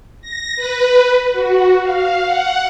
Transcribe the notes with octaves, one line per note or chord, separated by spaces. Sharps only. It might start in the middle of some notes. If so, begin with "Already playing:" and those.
A#6
B4
F#4
F5
F#5